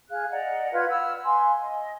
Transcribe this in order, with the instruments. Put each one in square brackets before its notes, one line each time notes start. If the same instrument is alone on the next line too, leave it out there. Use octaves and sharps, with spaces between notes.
[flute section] G#4 F5 F#6
D5 D#5 F#5 A#5
F4 B4 F5 G#6
F#5 B5 E6 F6
B4 F5 G#5 C6
D#5